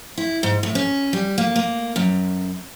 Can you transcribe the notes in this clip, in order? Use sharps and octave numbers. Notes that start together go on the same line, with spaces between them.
E4
G#2
A2
C#4
G3
A#3
A#3
F#2